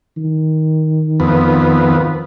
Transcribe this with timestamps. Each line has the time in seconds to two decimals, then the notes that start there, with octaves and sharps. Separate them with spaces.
0.17 D#3
1.20 F2 B3